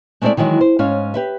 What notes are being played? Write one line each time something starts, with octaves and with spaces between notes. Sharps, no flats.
G#3 A3 C4 E4 A4 D5
D#3 E3 F#3 G#3
C5
G#2 C#4 F5
G4 B4 E5